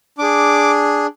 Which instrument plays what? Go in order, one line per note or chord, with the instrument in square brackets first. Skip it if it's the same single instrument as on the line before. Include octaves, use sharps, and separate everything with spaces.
[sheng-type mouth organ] D4 G#4 D6